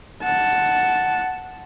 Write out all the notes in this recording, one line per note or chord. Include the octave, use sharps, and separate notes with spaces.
F#5 A5